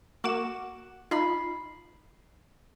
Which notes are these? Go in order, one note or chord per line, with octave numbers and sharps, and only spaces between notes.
A#3 F#4 D6 E7
D#4 F4 B5 C6